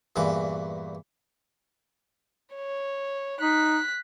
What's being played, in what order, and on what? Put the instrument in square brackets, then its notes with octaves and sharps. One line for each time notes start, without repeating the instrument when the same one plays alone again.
[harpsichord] E2 G2 A#2 E3 D6
[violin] C#5
[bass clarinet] D#4 [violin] F#6 B6